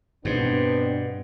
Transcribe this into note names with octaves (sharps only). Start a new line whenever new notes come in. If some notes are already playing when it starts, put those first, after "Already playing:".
G2 B2 B3 C4 D4